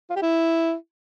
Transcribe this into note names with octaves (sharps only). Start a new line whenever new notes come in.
F4
G4
E4